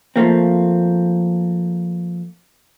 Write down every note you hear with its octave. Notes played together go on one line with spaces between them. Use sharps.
F3 A3 A#3 C4